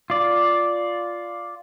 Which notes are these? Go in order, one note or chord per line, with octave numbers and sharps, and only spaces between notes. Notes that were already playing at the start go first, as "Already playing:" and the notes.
F4 D5